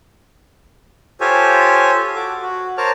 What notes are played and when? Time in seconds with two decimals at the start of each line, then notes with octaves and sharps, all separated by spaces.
1.21 F4 G4 A4 C5 C#5 G#5
2.16 F#4 A4 D6
2.42 F#4
2.78 A#4 C5 C#5 A5 D6 F6